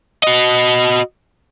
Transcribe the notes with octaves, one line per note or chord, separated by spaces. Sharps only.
F#4 D#5